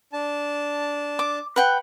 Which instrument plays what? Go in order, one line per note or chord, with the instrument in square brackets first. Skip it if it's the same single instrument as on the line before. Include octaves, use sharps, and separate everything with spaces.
[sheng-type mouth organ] D4 A5
[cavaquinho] D6
B4 F#5 G5